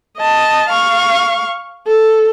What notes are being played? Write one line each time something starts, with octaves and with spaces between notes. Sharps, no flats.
D#5 A5
F5 C#6
A4